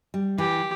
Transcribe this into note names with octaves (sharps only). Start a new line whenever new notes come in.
G3
E3 G4